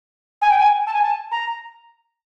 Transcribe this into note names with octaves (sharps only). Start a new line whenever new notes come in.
G#5
G5
G#5
A5
G#5
A5
A#5